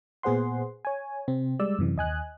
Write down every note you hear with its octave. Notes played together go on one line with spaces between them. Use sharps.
A#2 B3 G#4 C5 F#5 C6
C#5 G#5
C3 C4
G3 G#3 D5 E6
F#2 C3 E3
D#2 D#5 G#5 F#6